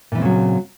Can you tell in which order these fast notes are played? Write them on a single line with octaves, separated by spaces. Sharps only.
A#2 E3 C4 C#3 F#3